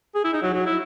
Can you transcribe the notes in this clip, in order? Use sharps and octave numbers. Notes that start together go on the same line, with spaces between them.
G#4
E4
D#4
F#3
F#3
E4